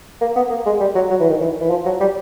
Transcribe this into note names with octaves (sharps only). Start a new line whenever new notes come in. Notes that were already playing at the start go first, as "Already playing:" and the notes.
A#3
B3
A#3
G#3
G3
F#3
F#3
E3
D#3
E3
E3
F3
F#3
G3